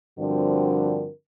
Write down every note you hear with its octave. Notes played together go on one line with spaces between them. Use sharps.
G2 D3 F3 C4 F#4 A#4